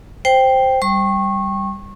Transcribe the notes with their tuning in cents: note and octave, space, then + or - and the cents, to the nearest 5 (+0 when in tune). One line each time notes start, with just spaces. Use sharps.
C5 +0 G5 +0
G3 +0 C#6 -25